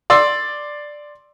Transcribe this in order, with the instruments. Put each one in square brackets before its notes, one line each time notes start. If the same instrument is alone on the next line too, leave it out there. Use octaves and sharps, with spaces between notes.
[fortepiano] D5 C6 E6